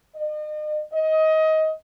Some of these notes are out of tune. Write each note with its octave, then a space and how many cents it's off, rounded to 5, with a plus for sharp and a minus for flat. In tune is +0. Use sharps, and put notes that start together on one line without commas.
D#5 -40
D#5 +20